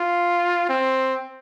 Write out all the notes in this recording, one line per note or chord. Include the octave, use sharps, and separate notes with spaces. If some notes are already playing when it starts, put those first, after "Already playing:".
Already playing: F4
C4